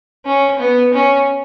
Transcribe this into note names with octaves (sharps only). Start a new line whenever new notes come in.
C#4
B3
C#4